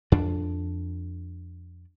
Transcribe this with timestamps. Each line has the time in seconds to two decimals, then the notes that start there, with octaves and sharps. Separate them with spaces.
0.12 F2 D4